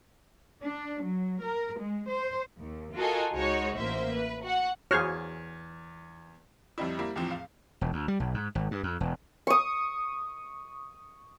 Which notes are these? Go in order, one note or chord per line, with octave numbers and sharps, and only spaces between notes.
D4
F#3
A#4
G#3
C5
D#2
F4 F#4 A4 A#4 D#5 G#5
C#2 G#3 D#4 F#4 C#5
A1 A#3 C5 E5
B4
F#4 F#5
E2 F#4 G#4 C5 C#5 F5 F6
F2 G3 C4 D#4 E4
G3 A#3 E4
E2 A2 F3 C4
F5
E1
D2
G3
B1
G#2
G#1
G2
F2
E1
C#6 D#6